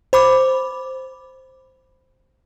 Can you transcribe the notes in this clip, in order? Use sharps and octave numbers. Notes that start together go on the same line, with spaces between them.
C5 B5 D6